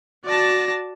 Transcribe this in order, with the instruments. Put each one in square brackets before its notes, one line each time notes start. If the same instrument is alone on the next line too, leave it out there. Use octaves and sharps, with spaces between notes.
[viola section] F#4 A5 [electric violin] D5 A#6